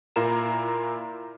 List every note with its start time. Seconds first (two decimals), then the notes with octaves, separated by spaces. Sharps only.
0.16 A#2 E4 F4 A#4 A#5 E7